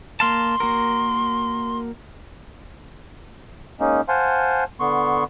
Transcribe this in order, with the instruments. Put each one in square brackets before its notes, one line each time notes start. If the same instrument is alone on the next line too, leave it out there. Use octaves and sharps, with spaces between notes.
[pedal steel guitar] A#3 F5 A5 [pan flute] C6
[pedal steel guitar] A#3 F#4 A#4
[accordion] G#3 A#3 C#4 D#4
C5 F5 F#5 G#5 A5 C6
D3 B3 C6 C#6